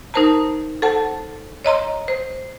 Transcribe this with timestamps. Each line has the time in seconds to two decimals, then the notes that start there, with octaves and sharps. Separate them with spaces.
0.14 D#4 A#4 C5 A5 A#5
0.82 A4 C5 F#5 A5
1.65 C#5 D#5 A#5 C6
2.08 C5